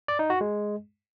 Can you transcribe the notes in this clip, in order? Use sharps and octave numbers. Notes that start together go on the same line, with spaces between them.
D5
D#4
F#4
G#3